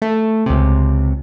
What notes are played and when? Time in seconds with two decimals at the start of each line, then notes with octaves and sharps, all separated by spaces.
0.02 A3
0.46 C#2 C3